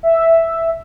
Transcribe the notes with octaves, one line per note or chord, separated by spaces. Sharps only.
E5